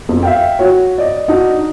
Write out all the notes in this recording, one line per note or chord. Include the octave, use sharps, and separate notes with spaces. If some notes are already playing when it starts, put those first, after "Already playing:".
F2
E5 F5 G5
F#4 C#5
D5 D#5
D4 D#4 F#4